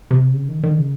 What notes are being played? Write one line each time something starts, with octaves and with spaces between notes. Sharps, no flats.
C3
C#3
D#3
D#3
C#3